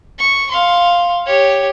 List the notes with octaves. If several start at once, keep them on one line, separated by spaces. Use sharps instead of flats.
C#6
F5 C6
G4 C#5